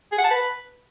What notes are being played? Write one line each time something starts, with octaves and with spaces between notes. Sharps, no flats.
G#4
F#5
A5
B4